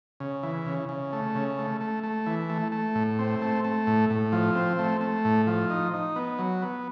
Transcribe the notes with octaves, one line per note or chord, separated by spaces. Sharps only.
C#3
E3
C#3
C#3
A3
C#3
A3
A3
A3
E3
A3
A3
A2
C4
A3
A3
A2
A2
F3
C4
A3
A3
A2
F3
D#4
D#4
B3
F#3
B3